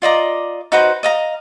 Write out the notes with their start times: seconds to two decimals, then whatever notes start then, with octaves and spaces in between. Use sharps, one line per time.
0.02 F4 D5 D#5 A#5
0.72 D#4 F#4 B4 C5
1.03 D#5 F5 A#5